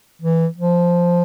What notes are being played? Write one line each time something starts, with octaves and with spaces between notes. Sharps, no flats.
E3
F3